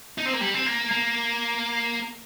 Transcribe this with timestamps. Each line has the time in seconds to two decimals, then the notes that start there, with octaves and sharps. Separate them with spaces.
0.18 D#4
0.25 C4
0.33 A#3
0.41 G3
0.54 C4
0.66 A#3
0.91 A#3